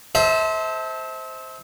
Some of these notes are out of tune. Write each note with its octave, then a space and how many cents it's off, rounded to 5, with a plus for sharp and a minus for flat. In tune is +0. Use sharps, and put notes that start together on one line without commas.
A4 +0 C5 +0 E5 -35